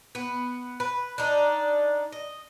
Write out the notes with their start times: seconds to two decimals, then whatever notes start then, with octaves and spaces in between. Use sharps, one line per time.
0.15 B3
0.80 B4
1.18 D4 D#4
2.12 D#5